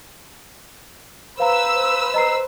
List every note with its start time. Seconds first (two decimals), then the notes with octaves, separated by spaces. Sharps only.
1.40 B4 C5 F5 A#5 E6
2.14 D#5 A#5 C7